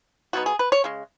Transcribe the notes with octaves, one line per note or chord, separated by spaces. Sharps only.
B2 F#3 B3 D#4 F#4
G#4
B4
C#5
C#3 G#3